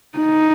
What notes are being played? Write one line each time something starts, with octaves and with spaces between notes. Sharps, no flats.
D#4